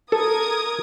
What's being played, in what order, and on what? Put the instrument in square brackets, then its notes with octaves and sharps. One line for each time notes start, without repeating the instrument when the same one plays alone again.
[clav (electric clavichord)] A4 [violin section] A#4 D#6 G#6